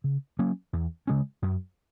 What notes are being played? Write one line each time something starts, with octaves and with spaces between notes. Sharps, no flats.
C#3
F#3 A#3 C#4
E2
C#3 G#3 C#4
F#2